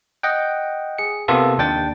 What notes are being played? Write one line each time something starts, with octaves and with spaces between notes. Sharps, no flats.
D#5 F#5 G5
G#4 C#7
C3 A#3 B3 F4 A4
D#2 D4 G5 A6